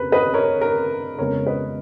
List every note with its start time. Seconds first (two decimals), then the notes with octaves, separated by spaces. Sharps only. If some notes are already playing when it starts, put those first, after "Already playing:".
Already playing: F2 C#3 B3 A#4 B4
0.12 B4 D#5
0.34 A#4 C#5
0.61 A#4
1.18 F2 C#3 G#3 B3 A#4 C#5
1.46 B4 D#5